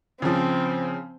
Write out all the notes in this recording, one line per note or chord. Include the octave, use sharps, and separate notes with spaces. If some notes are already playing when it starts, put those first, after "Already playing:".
C#3 F3 C4